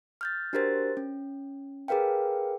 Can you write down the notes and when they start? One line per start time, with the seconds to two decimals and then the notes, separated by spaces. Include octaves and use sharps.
0.21 F6 G6 A6
0.53 D4 F#4 G4 A#4 C5 A6
0.97 C#4
1.88 G#4 A#4 B4 F5 G5